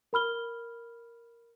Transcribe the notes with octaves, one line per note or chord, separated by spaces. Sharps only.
A#4 B5 F6 G7